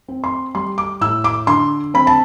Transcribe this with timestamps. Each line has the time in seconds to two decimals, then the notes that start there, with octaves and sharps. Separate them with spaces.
0.08 C4
0.24 C6
0.55 G3 C6
0.78 D6
1.01 A2 E6
1.24 D6
1.47 D3 C6
1.94 C4 B5
2.07 A5